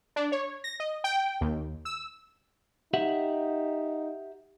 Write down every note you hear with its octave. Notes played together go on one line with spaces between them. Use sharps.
D4
C#5
A#6
D#5
G5
D#2
E6
D#4 G4 E5 F#5